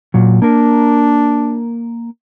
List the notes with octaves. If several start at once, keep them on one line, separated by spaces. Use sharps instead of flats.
A#2 F#3
A#3 D4 A#4